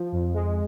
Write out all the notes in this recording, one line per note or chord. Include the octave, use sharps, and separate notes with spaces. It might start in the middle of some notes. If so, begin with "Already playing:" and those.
Already playing: F3
F2
G#3